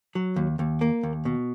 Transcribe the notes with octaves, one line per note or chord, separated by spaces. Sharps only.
F#3
D#2
D#2
A#3
D#2
B2